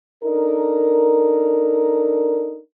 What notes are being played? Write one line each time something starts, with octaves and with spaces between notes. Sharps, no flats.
D4 D#4 A4 A#4